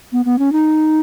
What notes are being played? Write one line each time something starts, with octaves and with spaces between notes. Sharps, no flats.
B3
B3
C#4
D#4